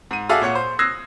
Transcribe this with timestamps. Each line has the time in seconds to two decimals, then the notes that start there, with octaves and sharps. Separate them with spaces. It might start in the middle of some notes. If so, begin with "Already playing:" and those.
0.11 G#2 D#7
0.29 F#4 G#4 A4 D5 E5 F5
0.42 A#2 C#5 F#5 C#7
0.55 C5
0.79 D#6 E6 F#6 G#6 A#6 C7